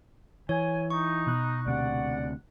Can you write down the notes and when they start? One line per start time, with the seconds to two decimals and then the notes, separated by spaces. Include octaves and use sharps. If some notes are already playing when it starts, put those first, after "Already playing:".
0.49 E3 C#5 G#5
0.90 D#4 C#6
1.27 B2 F#6
1.67 D2 C3 D5 F#5